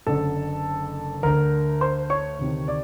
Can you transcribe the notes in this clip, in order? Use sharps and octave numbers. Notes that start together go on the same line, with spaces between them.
F#1 F#2 D3 A4 A5
D2 D3 A#4 A#5
C5 C6
C#5 C#6
D2 C3 D#3
D5 D6